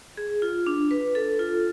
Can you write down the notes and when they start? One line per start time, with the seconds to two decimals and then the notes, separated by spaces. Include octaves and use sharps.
0.17 G#4
0.42 F4
0.67 D4
0.91 B4
1.15 A4
1.39 F4